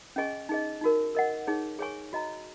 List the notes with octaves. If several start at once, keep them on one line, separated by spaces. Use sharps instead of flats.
C#4 G#4 D#5 G#5 C#6
D#4 G#4 D#5
D#4 F#4 A#4
A#4 D#5 F#5
D#4 G#4 C#5
G#4 C#5 G#5 C#6
F#4 D#5 A#5